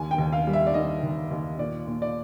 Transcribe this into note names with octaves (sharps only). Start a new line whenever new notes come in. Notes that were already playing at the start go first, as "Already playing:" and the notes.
Already playing: D#2 G#5
G5
D#2
F5
G3
E5
D5
D#3 D#5
D#2
D#2
A#2 D5
A#2
D5